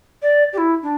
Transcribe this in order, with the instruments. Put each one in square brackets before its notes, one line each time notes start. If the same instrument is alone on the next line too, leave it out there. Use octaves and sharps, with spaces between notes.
[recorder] D5
G4
E4
D4